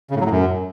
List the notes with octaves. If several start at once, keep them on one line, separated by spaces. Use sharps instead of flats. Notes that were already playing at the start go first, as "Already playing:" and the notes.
C#3
A2
F#3
A2
F#2